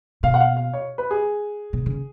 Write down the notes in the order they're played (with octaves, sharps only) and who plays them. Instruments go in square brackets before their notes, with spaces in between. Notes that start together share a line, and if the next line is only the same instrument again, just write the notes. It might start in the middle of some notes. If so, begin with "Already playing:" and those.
[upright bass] B2 [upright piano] F5
[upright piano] F#5
F5
F5
C#5
B4
G#4
[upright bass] B2
C#3